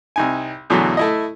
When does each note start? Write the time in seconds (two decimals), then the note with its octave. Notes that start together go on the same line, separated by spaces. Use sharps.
0.16 C2 D#4 G#5
0.70 E2 B2 D3 E3 F#3 A3
0.97 A3 E4 D#5